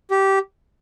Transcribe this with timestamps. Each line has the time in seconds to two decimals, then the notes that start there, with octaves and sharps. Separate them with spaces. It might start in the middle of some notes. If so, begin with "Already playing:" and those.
0.11 G4